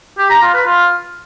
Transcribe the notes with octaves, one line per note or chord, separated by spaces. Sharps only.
G4
A#5
F4
B4
F4